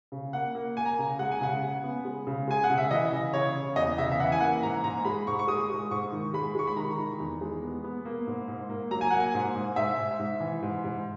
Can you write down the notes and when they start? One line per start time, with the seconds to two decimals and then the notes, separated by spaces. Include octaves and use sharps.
0.12 C#3
0.33 A#3 F#5
0.55 A#3
0.77 A#3 G#5
0.86 A#5
0.94 G#5
0.99 C#3
1.19 G#3 F#5
1.31 G#5
1.41 C#3 F#5
1.63 C#3
1.84 B3
2.05 G#3
2.27 C#3
2.48 G#3 G#5
2.64 F#5
2.70 C#3
2.78 E5
2.91 E3 D#5
3.12 C#3
3.33 C#3 C#5
3.56 C#3
3.76 E2 D#5
3.98 C#3 E5
4.12 E5
4.20 E3 F#5
4.32 G#5
4.40 A#3 F#5
4.63 G#2 A#5
4.83 G#2 A#5
5.05 G#3 B5
5.27 G#2 C#6
5.39 C#6
5.48 G#3 D#6
5.70 G#3
5.90 G#2 C#6
6.12 D#3
6.34 G#3 B5
6.55 G#3 C#6
6.67 B5
6.76 D#3 A#5
6.99 D#3
7.20 E2
7.41 G#3
7.62 B3
7.84 B3
8.05 A#3
8.27 G#2
8.48 G#2
8.69 A#3
8.91 F#3 A#5
9.01 G#5
9.10 A#3 F#5
9.20 G#5
9.34 G#2
9.55 G#2
9.76 G#2 E5
9.98 G#2
10.19 G#2
10.40 E3
10.62 G#2
10.84 G#2